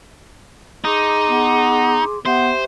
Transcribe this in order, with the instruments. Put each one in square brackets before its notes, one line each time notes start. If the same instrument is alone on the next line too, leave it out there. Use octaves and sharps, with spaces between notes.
[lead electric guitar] D#4 [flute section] G#4 C6 D6
[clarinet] B3
[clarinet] B3 [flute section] G4 E5 [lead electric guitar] C5